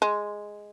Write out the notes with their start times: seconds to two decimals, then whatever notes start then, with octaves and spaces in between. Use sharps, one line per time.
0.02 G#3